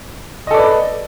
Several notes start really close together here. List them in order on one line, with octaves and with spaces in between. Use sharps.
D#5 A4 D5 B4